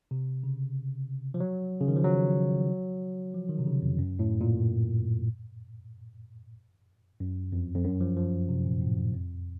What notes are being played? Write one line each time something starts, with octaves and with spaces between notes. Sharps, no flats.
C3
C#3
F3
F#3
C#3
D#3
F3
F#3
F3
D#3
C3
C#3
F2
F#2
A2
A#2
F#2
F2
F2
F#2
F3
F3
C3
A#2
A2
F#2
F2